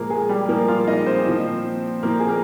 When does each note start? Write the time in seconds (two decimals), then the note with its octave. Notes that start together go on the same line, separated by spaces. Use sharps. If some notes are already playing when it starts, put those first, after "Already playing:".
Already playing: A#2 F3 G#3 A#3 A#4
0.10 G#3 G#4
0.29 G3 G4
0.49 A#2 F3 A#3 A#4
0.68 F4 F5
0.87 D#4 D#5
1.06 C4 C5
1.26 A#2 F3
2.02 A#2 F3 A#3 A#4
2.20 G#4
2.28 A#3 A#4